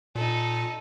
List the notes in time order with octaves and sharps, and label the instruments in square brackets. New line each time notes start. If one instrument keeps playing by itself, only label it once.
[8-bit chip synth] A#2 [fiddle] D#4 A4